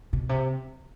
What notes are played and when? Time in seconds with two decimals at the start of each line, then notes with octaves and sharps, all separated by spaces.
0.13 B2
0.29 C3